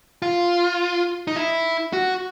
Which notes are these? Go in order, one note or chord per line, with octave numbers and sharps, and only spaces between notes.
F4
D#4
E4
F#4